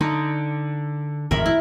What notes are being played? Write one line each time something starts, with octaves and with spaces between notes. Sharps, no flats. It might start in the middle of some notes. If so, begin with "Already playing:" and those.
D3 D#4
G#1 F2 A2 A#4 E5 B5
E4